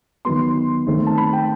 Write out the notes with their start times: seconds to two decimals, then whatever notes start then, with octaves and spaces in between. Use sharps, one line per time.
0.25 D#3 F#3 B3 C6
0.87 D#3 A3 C4
1.07 A5
1.18 B5
1.33 G5